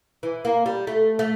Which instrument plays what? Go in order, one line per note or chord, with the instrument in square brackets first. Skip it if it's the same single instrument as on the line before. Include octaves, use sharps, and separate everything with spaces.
[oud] E3
A#3
G3
A3
A3